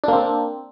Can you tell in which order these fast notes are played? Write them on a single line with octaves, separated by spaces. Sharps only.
D4 A#3 C4